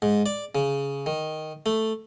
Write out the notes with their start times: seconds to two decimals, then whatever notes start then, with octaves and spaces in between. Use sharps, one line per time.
0.02 G#2
0.26 D5
0.55 C#3
1.06 D#3
1.66 A3